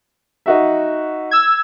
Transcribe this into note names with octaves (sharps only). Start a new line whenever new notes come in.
D#4 F#4 E5
E6 G#6